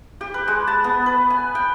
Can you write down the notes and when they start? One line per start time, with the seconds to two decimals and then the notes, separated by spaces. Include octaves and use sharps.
0.21 G4
0.34 B4
0.48 G#3
0.67 A5
0.84 B3
1.06 B4
1.30 G#5
1.55 G5